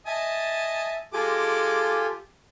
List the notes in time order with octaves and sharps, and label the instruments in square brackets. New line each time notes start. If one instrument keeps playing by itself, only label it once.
[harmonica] D#5 G#5 A5 [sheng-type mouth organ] E5
[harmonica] G#3 D6 [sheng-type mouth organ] F4 A4 G#5 [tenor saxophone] G4